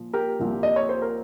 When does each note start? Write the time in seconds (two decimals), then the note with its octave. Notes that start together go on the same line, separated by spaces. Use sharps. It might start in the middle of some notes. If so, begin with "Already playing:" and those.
Already playing: A#2 F3
0.13 G4 A#4
0.40 C2 A#2 F3
0.63 D#5
0.76 C#5
0.89 C5
1.02 A#4